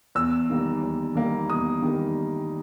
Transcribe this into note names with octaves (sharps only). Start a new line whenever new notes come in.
E2 E6
D#3 G3 A#3
E2
D#3 G3 A#3
E2 D#6
D#3 G3 A#3